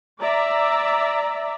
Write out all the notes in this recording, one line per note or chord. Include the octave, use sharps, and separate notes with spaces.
D5 E5 A#5